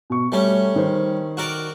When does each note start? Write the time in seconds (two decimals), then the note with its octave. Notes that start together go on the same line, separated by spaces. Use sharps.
0.10 B2 C#6
0.32 G3 A3 C#4
0.76 D#3 C5
1.37 F#4 A#4 D5